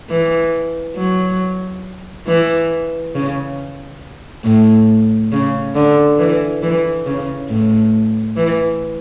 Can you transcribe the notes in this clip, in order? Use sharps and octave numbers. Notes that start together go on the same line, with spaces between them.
E3
F#3
E3
C#3
A2
C#3
D3
E3
E3
C#3
A2
E3